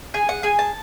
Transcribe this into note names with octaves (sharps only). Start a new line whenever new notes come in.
G#4 G#5
F#5
G#4 G#5
A5